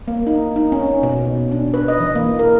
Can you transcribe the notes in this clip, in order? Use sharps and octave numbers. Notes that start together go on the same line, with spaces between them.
A#3
D#4
D#4
C#4
B2
D4
B4
D#5
E3
A#3
A#4